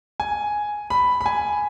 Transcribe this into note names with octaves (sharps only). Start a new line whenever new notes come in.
G#5
B5
B5
G#5